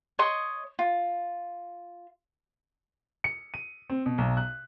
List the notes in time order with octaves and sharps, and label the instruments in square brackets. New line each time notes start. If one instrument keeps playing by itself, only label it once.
[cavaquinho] C#5 D#5 C6 D#6
F4
[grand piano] C#7
D#7
C4
B2
B1
F#6